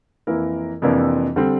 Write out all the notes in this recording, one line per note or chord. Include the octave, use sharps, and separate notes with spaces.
F2 E3 A#3 E4 A#4
F2 C3 E3 A#3 D4
D3 G3 C4